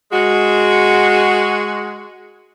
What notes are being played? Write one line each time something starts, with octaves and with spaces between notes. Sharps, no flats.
G#3 F#4